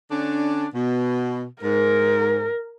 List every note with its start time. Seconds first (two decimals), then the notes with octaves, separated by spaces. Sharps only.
0.11 D3 C#4 D4
0.75 B2
1.62 G#2 A#4